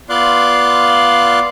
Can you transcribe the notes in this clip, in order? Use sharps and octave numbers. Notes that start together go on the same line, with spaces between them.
B3 F4 D5 F5 C6 F#6